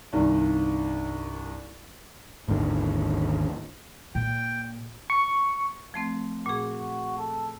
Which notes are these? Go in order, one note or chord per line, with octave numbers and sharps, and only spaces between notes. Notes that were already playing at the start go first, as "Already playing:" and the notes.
C2 G2 D#3
G#1 D#2 G#2 D3
A#2 G5
C#6
F3 A3 C4
A#2 F#4 G#4
A4